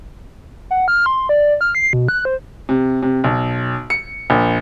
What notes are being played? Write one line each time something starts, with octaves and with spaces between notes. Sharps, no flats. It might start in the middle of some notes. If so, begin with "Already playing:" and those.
F#5
F6
C6
D5
F6
C7
B2
F#6
C5
C3
C3
B1
C#7
A#1